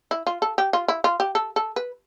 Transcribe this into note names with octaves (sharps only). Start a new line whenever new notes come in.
E4
F4
A4
G4
F4
E4
F4
G4
A4
A4
B4